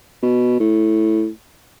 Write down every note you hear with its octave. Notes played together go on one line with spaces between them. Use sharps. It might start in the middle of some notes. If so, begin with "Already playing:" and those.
B2
A2